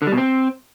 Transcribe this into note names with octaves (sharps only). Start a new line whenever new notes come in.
D3
G3
B2
C4